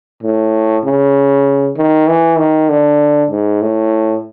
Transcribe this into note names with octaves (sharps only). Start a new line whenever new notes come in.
A2
C#3
D#3
E3
D#3
D3
G#2
A2